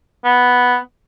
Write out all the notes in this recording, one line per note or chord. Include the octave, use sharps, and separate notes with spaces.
B3